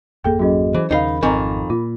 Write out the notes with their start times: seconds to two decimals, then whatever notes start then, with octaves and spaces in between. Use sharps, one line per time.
0.24 G#1 F2 A#3 G#4 A4 G5
0.39 F#3 C#4 F#4 G#4 D#5
0.74 E3 C5
0.91 D#2 C#3 D#4 A#4 F5 B5
1.23 G#1 F2 D#3 G#5 A#5
1.70 A#2 F4